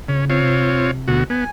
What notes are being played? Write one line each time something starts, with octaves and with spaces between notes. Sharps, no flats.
C#3 C#4
C4 F4 C#5
C3
D2 B2 F#4
B3 G#5